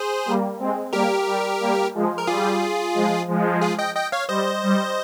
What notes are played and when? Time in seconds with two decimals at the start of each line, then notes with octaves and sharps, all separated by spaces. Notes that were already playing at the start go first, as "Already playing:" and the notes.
Already playing: G#4 C5
0.26 G3 A#3
0.59 G#3 C4
0.93 G3 A#3 G4 A#4
1.26 G3
1.61 G3 A#3
1.94 F3 G#3
2.18 A#4
2.27 G3 F4 G#4
2.95 F3 G#3
3.28 F3 G#3
3.62 F4 G#4
3.79 D#5 G5
3.95 D#5 G5
4.12 C#5 F5
4.29 G3 C5 D#5
4.63 G3